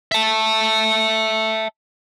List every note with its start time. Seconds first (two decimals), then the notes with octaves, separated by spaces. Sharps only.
0.12 E5 A5